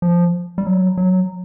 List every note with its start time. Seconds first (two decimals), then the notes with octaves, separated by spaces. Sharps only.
0.02 F3
0.58 G3
0.66 F#3
0.98 F#3